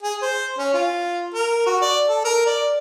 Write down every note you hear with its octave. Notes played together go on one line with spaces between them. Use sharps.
G#4
C5
C#4
F4
A#4
F#4
D5
A4
A#4
D5